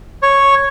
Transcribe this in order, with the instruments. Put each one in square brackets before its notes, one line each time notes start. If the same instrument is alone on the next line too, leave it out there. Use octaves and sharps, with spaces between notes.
[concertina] C#5